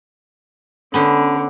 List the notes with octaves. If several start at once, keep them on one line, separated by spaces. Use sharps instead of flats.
D3 B3 C#4 C5